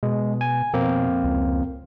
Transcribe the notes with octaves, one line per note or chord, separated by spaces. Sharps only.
B2 G#3
G#5
F2 B2 A#3 C4
C#2